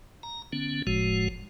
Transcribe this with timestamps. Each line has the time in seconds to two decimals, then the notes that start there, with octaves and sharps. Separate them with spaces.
0.23 A#5
0.53 D3 B3 C#4
0.87 F#1 A2 F3 G#3 F#4